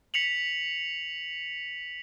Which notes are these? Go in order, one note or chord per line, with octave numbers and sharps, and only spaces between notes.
B6 C#7 F7 F#7